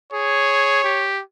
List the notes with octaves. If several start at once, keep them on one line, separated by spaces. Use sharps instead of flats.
G#4 C#5
G4